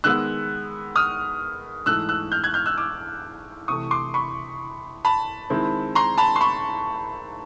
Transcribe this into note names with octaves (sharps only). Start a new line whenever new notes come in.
D#3 G#3 B3 E6 F#6
D#6 F6
G#2 E3 A3 E6 F#6
E6 F#6
F6 G6
F#6 G#6
F6 G6
E6 F#6
D6 E6
C3 E3 A3 C#6 D#6
C6 D6
B5 C#6
A5 B5
D#3 G#3 C4 E4
A#5 C6
A5 B5
C6
B5 C#6